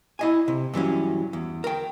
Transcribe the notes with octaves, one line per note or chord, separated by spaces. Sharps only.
E4 D#5 G#5
C3
G2 E3 F#3 C#4
E2
A#4 G5